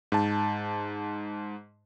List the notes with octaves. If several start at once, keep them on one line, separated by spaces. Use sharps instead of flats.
G#2 A5